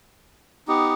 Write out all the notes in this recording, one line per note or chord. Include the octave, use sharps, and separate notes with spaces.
B3 D#4 G4